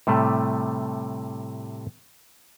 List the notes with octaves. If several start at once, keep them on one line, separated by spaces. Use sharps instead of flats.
A2 C3 G3 A3